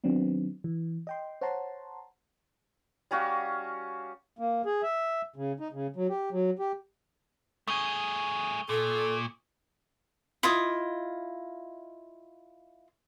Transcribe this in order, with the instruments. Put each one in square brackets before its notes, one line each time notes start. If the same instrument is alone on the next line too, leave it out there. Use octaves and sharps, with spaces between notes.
[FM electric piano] D#3 F#3 B3 C4 D4
E3
D#5 G5 C6
C5 C#5 F#5 A5 A#5 C6
[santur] G3 C#4 F#4 F5
[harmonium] A#3
G#4
E5
C#3
D#4
C#3
F#3
G4
F#3
G4
[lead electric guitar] A3 G#4 [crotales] C#6 D#6 G7
[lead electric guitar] A#2 [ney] A4
[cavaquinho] E4 F4 D#5